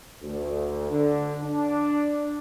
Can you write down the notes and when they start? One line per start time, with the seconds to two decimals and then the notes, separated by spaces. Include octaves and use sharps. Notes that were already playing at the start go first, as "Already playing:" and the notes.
0.22 D2
0.90 D3
1.44 D4